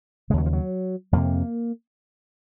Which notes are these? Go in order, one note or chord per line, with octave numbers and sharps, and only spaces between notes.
D#2 C#3 F#3 G#3
F3
F#3
F2 C3 A#3